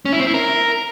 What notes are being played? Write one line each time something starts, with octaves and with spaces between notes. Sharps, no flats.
C#4
E4
C4
E4
A#4